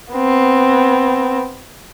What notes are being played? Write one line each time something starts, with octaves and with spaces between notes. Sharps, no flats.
B3 C4